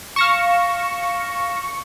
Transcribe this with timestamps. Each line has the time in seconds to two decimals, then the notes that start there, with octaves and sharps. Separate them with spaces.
0.16 F5 C#6 A#6 E7